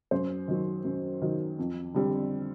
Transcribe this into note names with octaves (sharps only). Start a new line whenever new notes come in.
F#2 C5
D#3 F#3
F#2
D#3 F#3
F2
D3 G3 C4